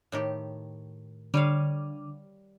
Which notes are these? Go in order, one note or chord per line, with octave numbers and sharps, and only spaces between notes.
A2 D#3 G4
D3 G3 C#5 F5